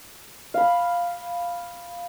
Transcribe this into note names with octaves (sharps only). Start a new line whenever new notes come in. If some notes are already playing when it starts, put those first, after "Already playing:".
F5 B5